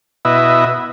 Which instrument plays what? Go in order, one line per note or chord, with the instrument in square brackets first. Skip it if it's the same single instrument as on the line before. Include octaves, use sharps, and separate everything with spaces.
[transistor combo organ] B2 E4 B4 D#5 E5